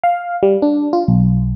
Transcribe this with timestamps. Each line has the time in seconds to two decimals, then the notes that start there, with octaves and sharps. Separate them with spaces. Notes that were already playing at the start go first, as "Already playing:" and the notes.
0.04 F5
0.43 G3
0.62 D4
0.93 F4
1.08 B1